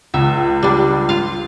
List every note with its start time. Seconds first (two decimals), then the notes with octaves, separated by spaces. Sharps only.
0.14 C#2 E5
0.63 G3 D4
1.09 F4 F5